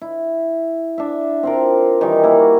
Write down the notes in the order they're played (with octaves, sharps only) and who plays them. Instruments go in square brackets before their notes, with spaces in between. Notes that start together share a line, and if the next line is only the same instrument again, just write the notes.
[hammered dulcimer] E4
D4 E5
C4 F4 A#4
D#3 E3 G3 D#4
A#3 E4
F#4